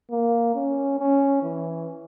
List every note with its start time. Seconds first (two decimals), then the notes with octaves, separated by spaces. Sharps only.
0.11 A#3
0.55 C#4
0.99 C#4
1.42 E3